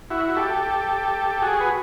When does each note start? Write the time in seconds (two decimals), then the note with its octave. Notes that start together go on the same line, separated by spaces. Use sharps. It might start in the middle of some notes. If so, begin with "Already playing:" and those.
0.11 E4 F#4
0.36 G4 A4
1.42 F#4 G#4
1.60 B4